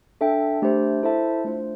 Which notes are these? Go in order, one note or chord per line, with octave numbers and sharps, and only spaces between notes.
D4 A4 E5 G5
A3 D4 G4 C5
E4 A4 C5 E5 A5
A3 D4 F4 C5